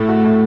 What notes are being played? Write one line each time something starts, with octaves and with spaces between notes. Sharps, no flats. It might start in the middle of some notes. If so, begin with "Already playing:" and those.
Already playing: A2 A3
F#4
A2